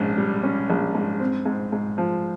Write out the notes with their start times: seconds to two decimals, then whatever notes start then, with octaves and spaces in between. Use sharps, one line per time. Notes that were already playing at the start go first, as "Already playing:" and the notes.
Already playing: A#1 G#2 C#4
0.18 G3
0.44 C#4
0.70 A#1
0.95 G#2
1.20 C4
1.46 G#2
1.72 G#2
1.98 F3